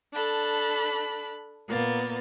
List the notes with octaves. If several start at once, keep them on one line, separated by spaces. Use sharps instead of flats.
D4 A4 B5
A#2 A#3 B3 A6